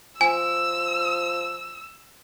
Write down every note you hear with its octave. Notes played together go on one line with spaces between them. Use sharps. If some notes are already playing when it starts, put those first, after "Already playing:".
F3 G#5 E6